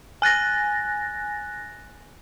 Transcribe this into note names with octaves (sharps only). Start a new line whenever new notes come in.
G#5 F#6 A6 A#6